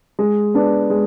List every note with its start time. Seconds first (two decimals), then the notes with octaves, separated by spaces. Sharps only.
0.19 G#3
0.54 B3 D4
0.90 G#3